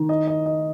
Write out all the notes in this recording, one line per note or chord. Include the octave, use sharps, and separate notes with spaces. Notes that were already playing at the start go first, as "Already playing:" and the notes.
Already playing: D#3
D#5
D#5
D#5